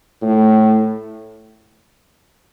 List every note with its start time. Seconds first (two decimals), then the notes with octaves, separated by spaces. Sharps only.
0.22 A2